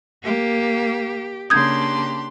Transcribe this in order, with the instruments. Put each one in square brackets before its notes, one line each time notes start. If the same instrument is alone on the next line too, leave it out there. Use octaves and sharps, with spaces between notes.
[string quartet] A#3 [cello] G4
[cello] C#3 A#3 [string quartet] D4 G4 C6 [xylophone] D#6 G6 G#6